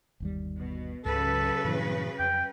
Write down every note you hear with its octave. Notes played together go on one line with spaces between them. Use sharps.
G1 D#2 G3
B2
C#2 G#2 C#3 F#3 A4 B4
G2 A#2 E3
F2 G5